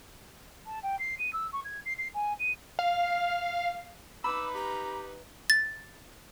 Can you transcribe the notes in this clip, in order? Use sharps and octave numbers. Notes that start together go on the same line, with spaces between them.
A5
G5
C7
D#7
E6
C#6
G#6
C7
C7
G#5
D#7
F5
D#4 B4 B5 D6 E6
G4 A#5
A6